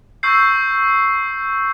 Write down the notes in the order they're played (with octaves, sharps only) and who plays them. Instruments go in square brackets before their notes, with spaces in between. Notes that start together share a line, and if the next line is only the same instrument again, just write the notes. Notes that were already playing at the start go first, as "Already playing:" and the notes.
[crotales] C#6 E6 G6 C7